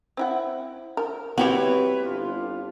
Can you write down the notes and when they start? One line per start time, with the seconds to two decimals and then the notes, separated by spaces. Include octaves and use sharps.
0.17 C4 E4 F#5
0.97 A#4
1.38 G3 C4 E4 F#4 B4 C#5
2.05 G1 D4 F4